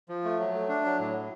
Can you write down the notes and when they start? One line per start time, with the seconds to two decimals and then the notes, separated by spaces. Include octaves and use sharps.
0.09 F3
0.24 A3
0.39 F#3
0.54 A3
0.69 D4
0.85 F#3
0.99 A2